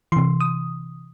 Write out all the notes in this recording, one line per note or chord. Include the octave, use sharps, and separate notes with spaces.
C3 E3 C6
D#6